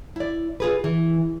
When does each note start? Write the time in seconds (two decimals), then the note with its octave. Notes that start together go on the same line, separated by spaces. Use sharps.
0.16 E4 D5
0.60 F4 G#4 B4
0.84 E3